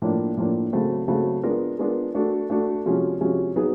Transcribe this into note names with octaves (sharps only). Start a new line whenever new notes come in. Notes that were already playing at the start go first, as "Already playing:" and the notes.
A2 F3 A#3 D4
A2 F3 A#3 D4
C#3 F#3 A3 C4
C#3 F#3 A3 C4
G#3 B3 D4 F4 A#4
G#3 B3 D4 F4 A#4
A3 D4 F#4 A4
A3 D4 F#4 A4
C3 F3 G#3 C#4 F#4
C3 F3 G#3 C#4 F#4
F#3 B3 D#4 G#4